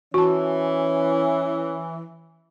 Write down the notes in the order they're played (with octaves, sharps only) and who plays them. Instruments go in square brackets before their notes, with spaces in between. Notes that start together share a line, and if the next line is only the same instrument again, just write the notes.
[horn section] E3 [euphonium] C#4 [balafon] F#4 A5